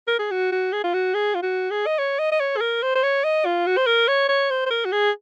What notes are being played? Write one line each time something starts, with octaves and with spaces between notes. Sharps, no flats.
A#4
G#4
F#4
F#4
G#4
F4
F#4
G#4
F4
F#4
G#4
D#5
C#5
D#5
D#5
C#5
G#4
A#4
C5
C5
C#5
D#5
F4
F#4
C5
A#4
C#5
C#5
C5
C5
A#4
F#4
G#4